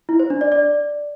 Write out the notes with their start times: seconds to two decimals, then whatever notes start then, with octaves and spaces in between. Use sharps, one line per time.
0.09 E4
0.19 C5
0.30 D4
0.41 D5
0.52 D5